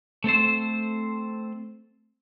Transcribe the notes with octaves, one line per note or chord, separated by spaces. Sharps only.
A3 C4 A4 C5